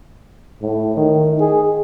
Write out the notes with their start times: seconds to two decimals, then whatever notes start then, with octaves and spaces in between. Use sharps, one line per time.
0.62 A2
0.97 D#3
1.40 G#4